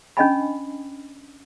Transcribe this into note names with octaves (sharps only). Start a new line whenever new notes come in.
C#4 D4 D#5 G5 G#5 B5